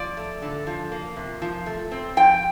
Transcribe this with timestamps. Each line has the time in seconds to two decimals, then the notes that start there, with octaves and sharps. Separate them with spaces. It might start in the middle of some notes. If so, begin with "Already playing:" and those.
Already playing: F3 D5
0.17 A3
0.42 D3
0.67 F3
0.92 A#3
1.16 C3
1.42 F3
1.66 A3
1.91 C4
2.17 F3 G5